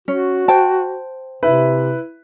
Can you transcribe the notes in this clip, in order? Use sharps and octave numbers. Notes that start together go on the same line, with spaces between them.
C#4 F#4
C5 G5 A5
C3 E4 B4